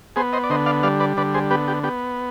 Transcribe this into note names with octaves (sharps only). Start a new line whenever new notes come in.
B3 G#4 C5
C5 D#5
D5
D3 C5 D#5
D5 F5
G3 D5 F5
B4 D5
D3 B4 D5
G#4 C5
B3 G4 B4
G4
B3 G4